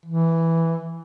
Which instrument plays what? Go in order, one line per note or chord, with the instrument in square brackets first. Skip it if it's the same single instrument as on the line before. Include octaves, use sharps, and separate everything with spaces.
[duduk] E3